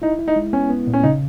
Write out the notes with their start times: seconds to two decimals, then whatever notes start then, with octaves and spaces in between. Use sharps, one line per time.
0.02 D#4 E4
0.19 E4
0.28 D#4
0.36 G#3
0.53 B3 C#4
0.69 B3
0.87 A#2
0.93 C#4
1.03 C#3 D#4